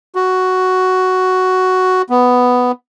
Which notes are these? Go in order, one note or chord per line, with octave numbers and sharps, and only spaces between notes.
F#4
B3